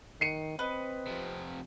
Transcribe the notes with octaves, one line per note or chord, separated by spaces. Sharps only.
D#3 C7 C#7 D#7
C4 B4 D#5
C3 F3